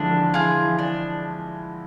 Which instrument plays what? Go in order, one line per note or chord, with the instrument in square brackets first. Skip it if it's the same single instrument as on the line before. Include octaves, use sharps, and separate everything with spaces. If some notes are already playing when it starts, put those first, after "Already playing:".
Already playing: [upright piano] D3 E3 F3 G#3 [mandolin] D4
[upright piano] D3
[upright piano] E3 [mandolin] F4 G#4
[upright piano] E3
[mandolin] D4